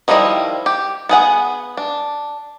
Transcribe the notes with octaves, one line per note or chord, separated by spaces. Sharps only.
D#3 F3 G3 E4 D#5
G4
B3 G#4 F#5
D4